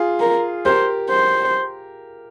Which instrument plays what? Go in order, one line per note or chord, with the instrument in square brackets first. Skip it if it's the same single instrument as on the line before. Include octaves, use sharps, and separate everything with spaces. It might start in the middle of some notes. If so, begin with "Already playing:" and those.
Already playing: [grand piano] F4 G#4
[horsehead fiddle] A#4
[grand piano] G4 A#4 [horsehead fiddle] C5
[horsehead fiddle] C5